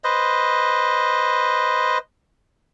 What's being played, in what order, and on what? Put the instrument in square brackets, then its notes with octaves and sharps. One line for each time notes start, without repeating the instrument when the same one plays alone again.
[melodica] B4 C5 D#5